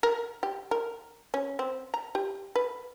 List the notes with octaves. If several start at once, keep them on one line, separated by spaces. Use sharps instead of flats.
A#4
G4
A#4
C#4
C4
A#5
G4
B4